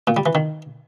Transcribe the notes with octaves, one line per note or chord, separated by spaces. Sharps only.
A#2
G3
E3
D#3